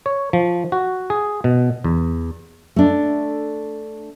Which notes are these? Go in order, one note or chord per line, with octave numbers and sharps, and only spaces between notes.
C#5
F3
F#4
G#4
B2
E2
A3 D4